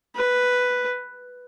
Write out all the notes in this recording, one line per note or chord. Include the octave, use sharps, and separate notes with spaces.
B4